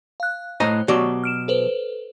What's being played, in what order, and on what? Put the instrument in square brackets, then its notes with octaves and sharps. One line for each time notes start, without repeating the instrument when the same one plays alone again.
[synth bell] F5 F#6
[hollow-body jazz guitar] A2 D#5 A#5 [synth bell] C5 F#6
[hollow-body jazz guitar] B2 F#3 D5 [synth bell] G4
[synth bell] F6 D7 E7
A4 B4 C5